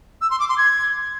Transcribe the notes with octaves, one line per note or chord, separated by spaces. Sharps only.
E6
C6
D6
C6
G#6